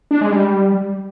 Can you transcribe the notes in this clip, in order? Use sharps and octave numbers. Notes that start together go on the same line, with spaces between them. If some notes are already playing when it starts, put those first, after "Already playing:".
D4
G#3
G3